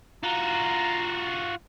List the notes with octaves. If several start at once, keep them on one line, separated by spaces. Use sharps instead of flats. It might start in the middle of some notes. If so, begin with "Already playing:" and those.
F4 F#4 A#5